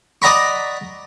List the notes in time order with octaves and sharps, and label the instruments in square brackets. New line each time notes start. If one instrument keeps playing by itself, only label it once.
[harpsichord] D5 D#5 F#5 A#5 B5 C#6